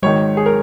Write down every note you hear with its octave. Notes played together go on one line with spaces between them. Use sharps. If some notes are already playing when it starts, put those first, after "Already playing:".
G#1 G#2 D#3 C#5
G#4
A#4